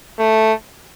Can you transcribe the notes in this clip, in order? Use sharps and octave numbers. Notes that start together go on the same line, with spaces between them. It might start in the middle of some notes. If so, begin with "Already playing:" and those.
A3